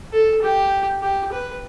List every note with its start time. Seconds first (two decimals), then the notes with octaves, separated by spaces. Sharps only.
0.12 A4
0.42 G4
1.02 G4
1.32 B4